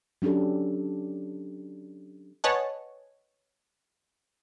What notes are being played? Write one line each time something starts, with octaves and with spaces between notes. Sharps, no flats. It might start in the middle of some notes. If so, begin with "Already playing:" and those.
F#3 C#4 D4 G4 A4
B4 C#5 D#5 F#5 G#5 A5